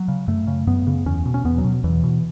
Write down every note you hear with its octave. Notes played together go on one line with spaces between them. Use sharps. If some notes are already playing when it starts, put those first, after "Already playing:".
Already playing: F#3
C#3
F#2 A3
C#3
F#2 B3
C#3
E2 C#4
B2
C#4
E2 B3
F#3
B2
E2 E3
B2